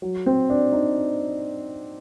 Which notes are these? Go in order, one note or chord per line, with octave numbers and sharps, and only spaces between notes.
F#3
C4
D4
D#4